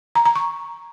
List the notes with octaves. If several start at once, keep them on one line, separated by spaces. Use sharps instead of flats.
A#5
A#5
C#6